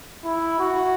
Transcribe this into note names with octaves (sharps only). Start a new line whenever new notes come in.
E4
F#4